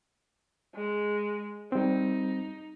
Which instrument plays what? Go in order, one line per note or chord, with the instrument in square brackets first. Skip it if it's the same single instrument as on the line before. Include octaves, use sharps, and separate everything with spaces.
[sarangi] G#3
[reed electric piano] G3 C4 [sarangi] D#4